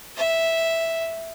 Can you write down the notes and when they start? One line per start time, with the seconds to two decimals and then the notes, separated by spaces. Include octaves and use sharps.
0.17 E5